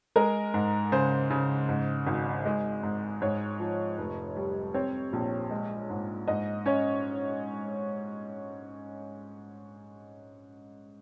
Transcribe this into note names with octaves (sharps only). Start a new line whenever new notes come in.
G#3 A#4
G#2
C#3 C5
C#3
G#2
G#1
G#3
G#2
G#2 C#5
F3
F1
G3
C4 C#5
A#1
G#3
G#2
G#2 D#5
C#4 C#5